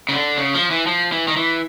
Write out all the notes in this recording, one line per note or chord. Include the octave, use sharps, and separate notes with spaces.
C#3
D3
C#3
F3
E3
F3
E3
D#3
E3